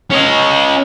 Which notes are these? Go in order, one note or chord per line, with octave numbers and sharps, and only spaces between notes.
C#4 D#5